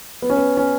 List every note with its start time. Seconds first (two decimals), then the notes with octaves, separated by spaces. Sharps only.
0.22 B3
0.30 C#4
0.37 B3
0.57 C#4